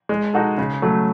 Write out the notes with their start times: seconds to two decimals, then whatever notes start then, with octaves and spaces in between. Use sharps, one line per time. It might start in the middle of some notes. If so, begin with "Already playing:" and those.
0.09 G#3
0.34 D#4 F#4 A4
0.58 C#3
0.82 F#3 A3